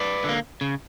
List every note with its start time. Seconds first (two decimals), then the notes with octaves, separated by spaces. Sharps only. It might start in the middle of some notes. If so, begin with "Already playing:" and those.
Already playing: B4 D5
0.24 D3 A#3
0.61 C#3